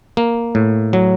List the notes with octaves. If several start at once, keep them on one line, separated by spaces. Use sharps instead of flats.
A#3
A2
F#3